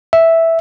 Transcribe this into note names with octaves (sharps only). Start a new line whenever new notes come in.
E5